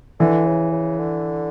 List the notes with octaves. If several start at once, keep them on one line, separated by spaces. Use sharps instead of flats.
D3 E3
C#3
C#3
D3